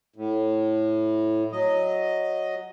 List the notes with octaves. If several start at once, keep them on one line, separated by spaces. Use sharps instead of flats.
A2
F#3 D#5